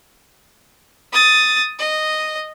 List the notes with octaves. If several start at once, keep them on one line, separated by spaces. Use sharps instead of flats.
D#6 A6
D#5